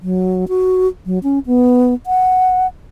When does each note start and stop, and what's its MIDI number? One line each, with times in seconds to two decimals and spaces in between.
0.01 0.45 54
0.48 0.88 66
1.06 1.19 54
1.23 1.39 61
1.46 1.94 59
2.06 2.67 78